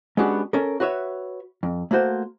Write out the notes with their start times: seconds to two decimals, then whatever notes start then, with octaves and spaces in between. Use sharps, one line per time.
0.17 G#3 B3 C#4 D4 F#4 G4
0.53 C#4 A4 A#4
0.80 F#4 B4 C#5 E5
1.63 F2
1.91 A3 A#3 F#4 C5